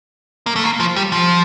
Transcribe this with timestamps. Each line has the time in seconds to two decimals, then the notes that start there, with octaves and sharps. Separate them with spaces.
0.47 A#3
0.56 A3
0.64 A#3
0.80 F3
0.96 G3
1.12 F3